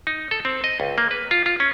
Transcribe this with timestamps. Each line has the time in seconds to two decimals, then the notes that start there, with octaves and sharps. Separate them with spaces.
0.07 D#4
0.31 A4
0.45 C4
0.64 D#5
0.80 C#2
0.98 A#3
1.11 B4
1.31 F4
1.46 F4
1.60 C#4